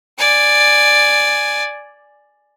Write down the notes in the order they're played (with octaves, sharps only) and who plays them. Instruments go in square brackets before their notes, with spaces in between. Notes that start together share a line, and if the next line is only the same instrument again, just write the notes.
[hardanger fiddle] D5 G#5